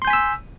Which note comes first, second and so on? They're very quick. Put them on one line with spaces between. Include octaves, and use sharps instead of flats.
C6 G6 G#5 B6 E6